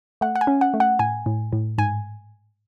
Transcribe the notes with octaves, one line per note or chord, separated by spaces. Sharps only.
A3 F#5
F#5
G#5
C#4
F#5
A3
F#5
A2 G#5
A2
A2
G#2 G#5